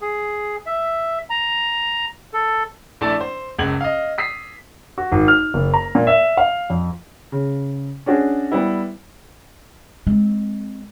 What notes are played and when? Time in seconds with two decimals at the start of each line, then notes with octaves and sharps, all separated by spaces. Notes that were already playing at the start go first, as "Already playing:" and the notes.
0.02 G#4
0.66 E5
1.30 A#5
2.33 A4
3.01 A#1 A3 E4 D5 A5
3.21 C5
3.58 F#1 C#2 G#6 F#7
3.81 D#5 F5
4.18 D#6 B6 C7
4.98 F#4
5.12 G#1
5.28 F6
5.54 F#1
5.74 A#5
5.95 A#2
6.07 E5
6.37 F5
6.70 F2
7.32 C#3
8.06 C#4 D4 F#4 G#4
8.52 G3 B3 E4
10.07 G#3 C4